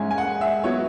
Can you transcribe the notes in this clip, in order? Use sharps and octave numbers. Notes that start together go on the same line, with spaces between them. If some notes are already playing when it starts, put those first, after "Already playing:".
Already playing: G#2 G#3 C#4 E4 G#5
G#5
F#5
E5
F#3 B3 E4 C#5